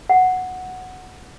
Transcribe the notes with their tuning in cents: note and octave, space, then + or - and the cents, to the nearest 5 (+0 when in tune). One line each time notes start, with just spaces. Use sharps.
F#5 -5